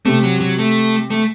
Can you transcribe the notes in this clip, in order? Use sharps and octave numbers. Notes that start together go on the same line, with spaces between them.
C3 A3
F#3
F#3
A3
A3